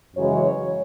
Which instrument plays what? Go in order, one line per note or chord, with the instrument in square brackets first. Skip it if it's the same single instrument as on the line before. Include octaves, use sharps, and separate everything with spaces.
[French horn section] F#2 C#3 E3 G#3 C#5